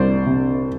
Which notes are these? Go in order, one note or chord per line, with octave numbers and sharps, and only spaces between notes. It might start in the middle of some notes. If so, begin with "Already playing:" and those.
Already playing: C2 C5 D5
C3